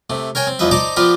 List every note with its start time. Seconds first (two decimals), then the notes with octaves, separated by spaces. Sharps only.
0.10 C3 A3
0.35 A#4 C#5 G5 G#5
0.47 C4
0.59 E2 F3 D#4 B4 E5
0.71 D#4 C5 D5 A5 A#5 D6
0.96 F3 B3 F4 G4 A#4 D5